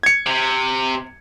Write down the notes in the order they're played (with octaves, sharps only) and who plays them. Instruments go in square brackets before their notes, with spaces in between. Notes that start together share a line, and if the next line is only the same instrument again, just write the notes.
[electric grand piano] G#6 C#7
[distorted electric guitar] C3